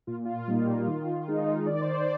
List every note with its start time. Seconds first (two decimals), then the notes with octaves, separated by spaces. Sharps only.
0.07 A#2 F4
0.25 F4
0.48 G3 A#3 D#4
0.87 D#3
1.28 G#3 D#4
1.66 D#3 D5
1.81 C5
1.94 D5